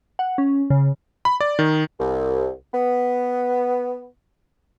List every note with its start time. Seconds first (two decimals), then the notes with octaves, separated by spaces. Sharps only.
0.19 F#5
0.38 C#4
0.70 C#3
1.25 B5
1.41 D5
1.59 D#3
1.99 C2
2.73 B3